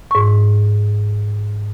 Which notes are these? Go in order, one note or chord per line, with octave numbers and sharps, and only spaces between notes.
G#2 C#6